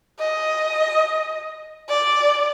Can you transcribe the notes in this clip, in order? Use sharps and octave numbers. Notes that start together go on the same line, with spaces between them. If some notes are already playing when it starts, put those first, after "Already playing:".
D#5
D5